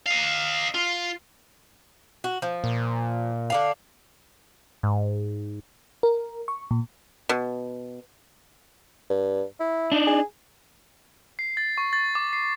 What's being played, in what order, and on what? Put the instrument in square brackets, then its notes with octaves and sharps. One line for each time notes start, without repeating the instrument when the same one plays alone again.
[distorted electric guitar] D#5 F5
F4
[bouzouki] F#4
F3
[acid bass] A#2
[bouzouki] D3 D4 F5
[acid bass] G#2
[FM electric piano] A#4
C#6
A#2
[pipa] B2
[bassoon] G2
E4
[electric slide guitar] D4 D#4
[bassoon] G#4
[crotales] C7
A6
C#6
A6
D6
C7